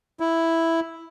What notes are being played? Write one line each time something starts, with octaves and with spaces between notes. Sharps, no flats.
E4